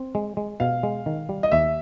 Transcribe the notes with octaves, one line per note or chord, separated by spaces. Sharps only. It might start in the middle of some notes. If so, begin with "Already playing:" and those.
Already playing: C4
G#3
G#3
B2 F5
G#3
D#3
G3
D#5
D#2 E5